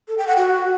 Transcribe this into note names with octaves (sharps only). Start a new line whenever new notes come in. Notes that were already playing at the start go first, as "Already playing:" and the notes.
A4
G5
F#5
F#4